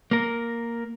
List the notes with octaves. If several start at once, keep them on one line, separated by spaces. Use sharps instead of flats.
A#3 A#4